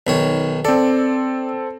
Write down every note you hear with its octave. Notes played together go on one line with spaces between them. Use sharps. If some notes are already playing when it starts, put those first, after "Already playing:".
B1 D#3 C#5
C4 A4 D5